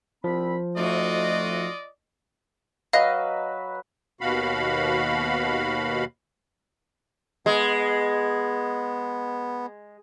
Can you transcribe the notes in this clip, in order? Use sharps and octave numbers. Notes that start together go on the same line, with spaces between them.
C2 F3 C4 B5
F2 A3 D#4 F4 F#4 D5 D#5
F#3 B4 D#5 F5 F6
D#2 B2 F#4 F5 B5
G#3 B3